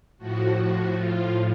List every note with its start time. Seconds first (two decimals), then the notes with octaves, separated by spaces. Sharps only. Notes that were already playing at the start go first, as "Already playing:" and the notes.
0.18 A2 F3 F#4
0.57 F#4
0.97 F4